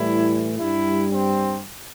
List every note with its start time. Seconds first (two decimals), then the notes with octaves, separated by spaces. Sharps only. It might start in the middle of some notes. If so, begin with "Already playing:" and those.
Already playing: A2 E3 G3 E4
0.59 G2 G3 E4
1.11 C4